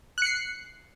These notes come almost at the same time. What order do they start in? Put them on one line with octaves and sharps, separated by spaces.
F#6 C#7 C7